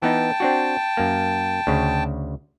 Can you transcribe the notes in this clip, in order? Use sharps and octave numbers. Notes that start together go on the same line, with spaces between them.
E3 B3 D#4 G5 A5
C4 D4 F#4
F#2 A#3
D2 C#3